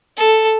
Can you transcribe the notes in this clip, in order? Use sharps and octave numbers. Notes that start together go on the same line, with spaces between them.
A4